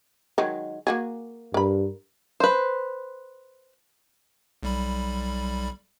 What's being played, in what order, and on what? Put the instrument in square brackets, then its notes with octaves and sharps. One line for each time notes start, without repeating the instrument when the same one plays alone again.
[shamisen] D#3 F#3 G#3
A#3 F#4 G#4
[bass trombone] G2 [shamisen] A#4 B5
[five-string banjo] B4 C5
[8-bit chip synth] B1 G3 B5